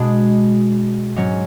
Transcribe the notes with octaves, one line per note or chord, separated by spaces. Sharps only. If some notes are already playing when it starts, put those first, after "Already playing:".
Already playing: B2 G#3 D4
G#2 F#3 C#4